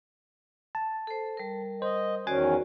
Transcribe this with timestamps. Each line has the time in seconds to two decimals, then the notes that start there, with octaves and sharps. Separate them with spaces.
0.75 A5
1.07 A4 C5
1.37 G3 A#4
1.82 C5 D#5
2.27 E2 D#3 C#4 F#4 C5 D5 G#5